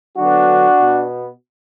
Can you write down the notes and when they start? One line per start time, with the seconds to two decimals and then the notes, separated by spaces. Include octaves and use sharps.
0.16 D3 F#3 B3 D4 F#4
0.79 B2 B3